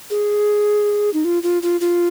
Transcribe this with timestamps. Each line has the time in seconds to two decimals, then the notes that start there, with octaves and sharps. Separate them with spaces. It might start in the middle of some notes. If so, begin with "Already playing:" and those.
0.10 G#4
1.14 D#4
1.25 F4
1.43 F4
1.63 F4
1.81 F4